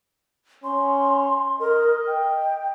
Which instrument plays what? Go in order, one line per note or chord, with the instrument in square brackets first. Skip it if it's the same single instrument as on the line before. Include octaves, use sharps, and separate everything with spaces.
[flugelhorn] C#4 [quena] C6
[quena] A#4 [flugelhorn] D#5
[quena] G5